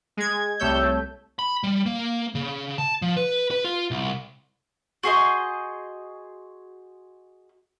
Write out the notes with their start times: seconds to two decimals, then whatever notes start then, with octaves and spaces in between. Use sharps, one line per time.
0.17 G#3 G#6
0.59 C2 G3 A3 C#5 E6 G6
0.83 A3
1.39 B5
1.63 G3
1.86 A#3
2.35 C#3
2.78 A5
3.02 F3
3.17 B4
3.51 B4
3.64 F4
3.91 C2
5.03 F#4 G#4 C5 D#5